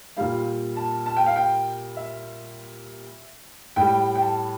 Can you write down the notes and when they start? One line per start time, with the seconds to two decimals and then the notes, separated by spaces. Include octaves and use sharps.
0.17 A#2 G3 F5
0.76 A5
1.06 A5
1.17 G5
1.26 F5
1.36 G5
1.97 E5
3.76 A2 G3 G5
4.15 G5
4.22 A5